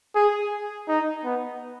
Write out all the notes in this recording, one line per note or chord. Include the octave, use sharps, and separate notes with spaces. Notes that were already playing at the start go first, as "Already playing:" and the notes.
G#4
D#4
B3